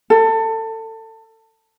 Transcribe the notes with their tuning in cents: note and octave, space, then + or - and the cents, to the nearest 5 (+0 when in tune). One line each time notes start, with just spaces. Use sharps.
A4 +25